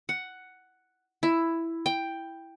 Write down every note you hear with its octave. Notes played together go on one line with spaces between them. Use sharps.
F#5
E4
G5